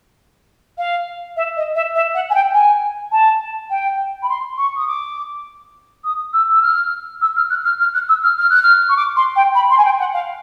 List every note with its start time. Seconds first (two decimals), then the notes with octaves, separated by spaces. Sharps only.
0.78 F5
1.36 E5
1.56 D#5
1.75 E5
1.95 E5
2.14 F#5
2.29 G#5
2.34 G5
2.53 G#5
3.12 A5
3.70 G5
4.22 B5
4.29 C6
4.58 C#6
4.76 D#6
4.87 D6
6.04 D#6
6.33 E6
6.52 E6
6.62 F6
7.21 E6
7.36 F6
7.50 F#6
7.65 F6
7.80 F6
7.94 F#6
8.09 E6
8.23 F6
8.38 F6
8.50 F#6
8.63 F6
8.89 C#6
8.97 D6
9.16 C6
9.36 G5
9.55 B5
9.70 C6
9.78 G#5
9.85 G5
9.99 F#5
10.13 F5